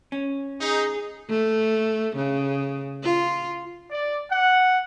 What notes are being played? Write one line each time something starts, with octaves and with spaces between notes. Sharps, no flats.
C#4
D#4 G#4
A3
C#3
F4
D5
F#5